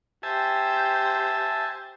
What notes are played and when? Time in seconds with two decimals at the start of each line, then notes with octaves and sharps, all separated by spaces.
0.23 G4 C5 E5 G#5 A5